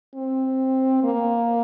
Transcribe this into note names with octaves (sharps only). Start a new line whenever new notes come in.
C4
A#3